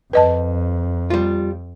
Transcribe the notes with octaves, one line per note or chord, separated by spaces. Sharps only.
F2 B4 D#5 A5
G3 F4